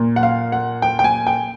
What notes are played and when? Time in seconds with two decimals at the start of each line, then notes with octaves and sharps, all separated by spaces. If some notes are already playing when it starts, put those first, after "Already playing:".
Already playing: A#2
0.16 F#5
0.23 F5
0.52 F#5
0.82 G5
0.99 G5
1.04 G#5
1.27 G5